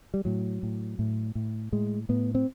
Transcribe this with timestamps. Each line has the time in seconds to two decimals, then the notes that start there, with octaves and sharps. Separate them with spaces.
0.14 G3
0.25 A2 F#3
0.63 A2
0.99 A2
1.35 A2
1.72 A2 G#3
2.09 A2 B3
2.35 C4